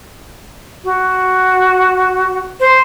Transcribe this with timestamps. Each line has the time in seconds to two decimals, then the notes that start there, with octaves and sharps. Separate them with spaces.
0.84 F#4
2.60 C5